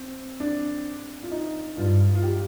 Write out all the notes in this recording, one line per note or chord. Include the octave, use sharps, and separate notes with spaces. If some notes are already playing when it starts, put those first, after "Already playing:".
Already playing: C4
D4
F4
D#4
G2 F4
F4
G4